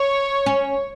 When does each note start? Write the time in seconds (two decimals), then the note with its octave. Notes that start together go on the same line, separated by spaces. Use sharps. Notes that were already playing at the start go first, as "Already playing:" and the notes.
Already playing: C#5
0.46 C#4